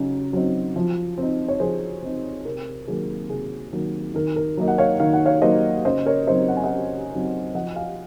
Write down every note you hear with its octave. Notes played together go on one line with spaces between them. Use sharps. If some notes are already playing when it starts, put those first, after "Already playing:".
Already playing: C#3 F#3 D#4
F#3 C4 D#4
F3
C4 D#4
C#5
F3 G#4 C5
C4 D#4
C3 A#4
D#3 F#3 A#3 G#4
C3 G#4
D#3 F#3 A#3
D#3 A#4
A#4
F#3 A#3 D#4
F#5
C#5 F5
D#3 F5
F#5
C#5 F5
F#3 A#3 D#4 C5 D#5
C#3 C5 D#5
A#4 C#5
F#3 C4 D#4 C5 D#5
F#5
G#5
D#5 F#5
C#3
F#3 C4 D#4
F3 D#5 F#5
F5 G#5